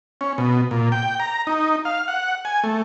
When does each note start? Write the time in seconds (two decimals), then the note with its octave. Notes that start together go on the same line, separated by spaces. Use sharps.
0.21 C#4
0.38 B2
0.71 A#2
0.92 G5
1.20 A#5
1.47 D#4
1.85 F5
2.08 F#5
2.45 G#5
2.64 A3